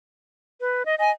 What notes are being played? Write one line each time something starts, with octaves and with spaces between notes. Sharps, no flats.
B4
D#5
D#5 G#5